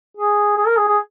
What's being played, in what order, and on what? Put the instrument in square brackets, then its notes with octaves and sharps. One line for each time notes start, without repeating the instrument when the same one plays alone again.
[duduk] G#4
G#4
A#4
G#4
G#4